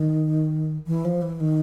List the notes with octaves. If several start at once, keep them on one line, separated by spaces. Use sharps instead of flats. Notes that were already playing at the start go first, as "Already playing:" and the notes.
Already playing: D#3
E3
F3
E3
D#3